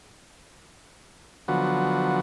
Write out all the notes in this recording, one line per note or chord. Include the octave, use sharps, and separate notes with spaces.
D3 F3 F#3 B3 F#4